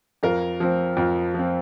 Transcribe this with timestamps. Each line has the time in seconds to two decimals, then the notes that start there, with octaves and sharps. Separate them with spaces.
0.23 F2 F4 A#4
0.60 F3 C4
0.97 F2
1.34 F3 C4